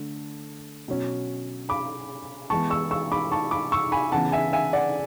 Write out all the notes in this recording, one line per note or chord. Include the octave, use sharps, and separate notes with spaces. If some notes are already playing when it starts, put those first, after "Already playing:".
Already playing: D3 A3
B2 F#3 C#4
B5 D6
E3 G#3 B3 A5 C#6
C#6 E6
C#6 E6
B5 D6
A5 C#6
B5 D6
C#6 E6
G#5 B5
C#3 E3 B3 F#5 A5
E5 G#5
E5 G#5
D5 F#5